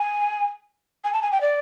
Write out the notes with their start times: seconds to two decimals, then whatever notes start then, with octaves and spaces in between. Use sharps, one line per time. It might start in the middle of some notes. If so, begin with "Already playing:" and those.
Already playing: G#5
1.04 G#5
1.13 A5
1.22 G#5
1.32 G5
1.41 D5